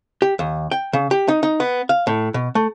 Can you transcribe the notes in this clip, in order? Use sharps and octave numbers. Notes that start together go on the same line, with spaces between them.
G4
D#2
G5
C#3
G4
D#4
D#4
B3
F5
A2
B2
A3